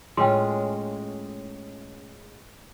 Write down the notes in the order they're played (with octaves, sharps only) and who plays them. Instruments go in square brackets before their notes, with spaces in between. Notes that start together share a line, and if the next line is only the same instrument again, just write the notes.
[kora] A2 C#4 F4 [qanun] G#3 [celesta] G5 C6